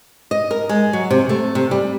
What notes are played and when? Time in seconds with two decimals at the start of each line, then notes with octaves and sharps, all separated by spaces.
0.31 D#5
0.51 A#4
0.69 G#3
0.93 F#3
1.10 C3
1.29 A3
1.55 C3
1.71 G3